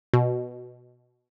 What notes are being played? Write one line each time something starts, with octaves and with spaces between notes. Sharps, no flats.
B2